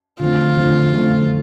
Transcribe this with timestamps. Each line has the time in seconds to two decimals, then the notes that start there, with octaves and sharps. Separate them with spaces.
0.19 D3 F3 A3 C4 F4
0.57 D3 F3 A3 C4
0.93 D3 F3 A3 C4